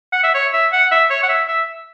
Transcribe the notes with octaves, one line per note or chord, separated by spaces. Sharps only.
F#5
E5
C#5
E5
F#5
E5
C#5
F#5
E5
E5